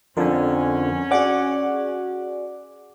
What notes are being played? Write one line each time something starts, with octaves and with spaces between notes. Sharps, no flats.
F2 D3 F3 C#4 A#4 G#5
F#4 G#4 D5 F#5 D6